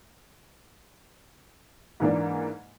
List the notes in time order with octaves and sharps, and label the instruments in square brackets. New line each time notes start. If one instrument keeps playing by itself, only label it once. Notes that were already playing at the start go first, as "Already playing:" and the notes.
[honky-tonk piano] G#2 E3 A#3 D4